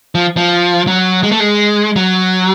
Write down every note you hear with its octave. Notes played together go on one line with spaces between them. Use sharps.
F3
F3
F#3
G#3
A3
G#3
F#3